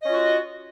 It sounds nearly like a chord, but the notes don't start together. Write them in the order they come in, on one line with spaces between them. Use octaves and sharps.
D#5 C#4 F4 F#4